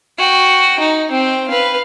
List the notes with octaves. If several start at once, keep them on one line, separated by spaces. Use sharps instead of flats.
F#4 G5
D#4
C4 G5
B4 F5